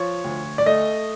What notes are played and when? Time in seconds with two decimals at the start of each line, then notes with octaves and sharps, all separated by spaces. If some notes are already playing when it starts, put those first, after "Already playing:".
Already playing: F3 C#5
0.24 D2
0.58 D5
0.66 A3 D#5